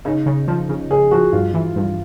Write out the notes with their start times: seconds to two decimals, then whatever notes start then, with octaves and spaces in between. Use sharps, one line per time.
0.05 C#3 D#4
0.26 C#3
0.48 F3
0.69 C#3
0.90 C#3 G#4
1.11 F3 F#4
1.32 G2 F4
1.54 E3
1.76 G2